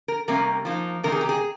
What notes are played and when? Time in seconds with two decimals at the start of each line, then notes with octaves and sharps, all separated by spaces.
0.08 A#4
0.28 C3 G3 A#3 C#4 A#4
0.65 F3 A#3 D#4
1.03 C3 D#3 A#3 D#4 A#4
1.12 G#4
1.21 G4
1.29 G#4